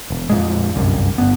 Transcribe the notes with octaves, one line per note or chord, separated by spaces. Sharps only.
E1
F2 A#2 G#3
G1 C2 F#2
G1 B3